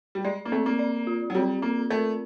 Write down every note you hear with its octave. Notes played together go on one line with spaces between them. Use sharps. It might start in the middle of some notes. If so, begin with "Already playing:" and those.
G3
G#3 D5
A#3
A3 C4
A#3
D5
F4
F#3
G3 C4
A#3 C4
A3 A#4